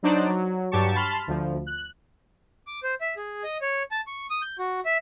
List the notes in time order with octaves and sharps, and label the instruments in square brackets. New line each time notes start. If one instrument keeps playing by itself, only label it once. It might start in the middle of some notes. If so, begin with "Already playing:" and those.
[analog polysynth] F#3 D4 D#4 C5 D5
F#3
G2 F#3 G4 A5 C#6
A5 B5 C6 F6
D2 F3
F#6
[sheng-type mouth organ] D6
C5
E5
G#4
D#5
C#5
A5
C#6
D#6
G6
F#4
E5